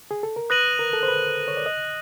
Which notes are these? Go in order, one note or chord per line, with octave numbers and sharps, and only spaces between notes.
G#4
A4
A#4
B4 D#6 F#6 A#6 D#7 F#7
A#4
A4
C5
B4
C#5
D5
D#5